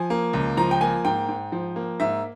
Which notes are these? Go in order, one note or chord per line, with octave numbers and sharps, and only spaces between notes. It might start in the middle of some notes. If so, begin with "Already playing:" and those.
Already playing: F3 G#5
A#3
C#2
F3 A#5
G5
A#3 G#5
G#2 G5
G#2
F3
A#3
G#2 E5